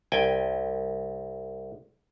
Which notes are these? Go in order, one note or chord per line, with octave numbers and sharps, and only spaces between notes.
C2 G5 G#5